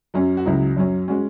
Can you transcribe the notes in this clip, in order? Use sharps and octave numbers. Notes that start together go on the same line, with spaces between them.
F#2 F#3 C#4
F#4
C#2 C#3 F#3 E4
F#2 F#3 C#4
G#3 C#4 F#4